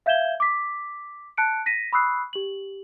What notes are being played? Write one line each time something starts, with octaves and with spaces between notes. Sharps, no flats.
E5 F5 G6 G#6 E7 G7
D6 B6
A5 F#6 C#7 D7
A#6 B6 D#7
B5 C#6 D#6 E6 F#6 C7
G4 F#7